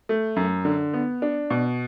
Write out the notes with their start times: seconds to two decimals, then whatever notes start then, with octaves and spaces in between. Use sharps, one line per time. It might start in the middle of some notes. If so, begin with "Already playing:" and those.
0.09 A3
0.36 F#2
0.65 D3
0.94 B3
1.22 D4
1.50 B2